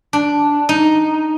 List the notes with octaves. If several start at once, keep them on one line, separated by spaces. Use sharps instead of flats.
D4
D#4